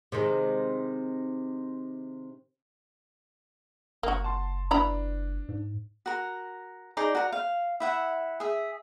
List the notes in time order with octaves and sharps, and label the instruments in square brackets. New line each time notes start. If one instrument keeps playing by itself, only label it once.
[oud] C3 D#3 G#3
[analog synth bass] F#1 [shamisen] A#3 F#4
[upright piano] A5 C6
[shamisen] E3 A#5 B5 [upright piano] D4
[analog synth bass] G#2
[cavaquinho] F#4 A#4
D#4 G#4 D5 A#5
F#4 A#4
F5
E4 E5 F#5
G#4 E5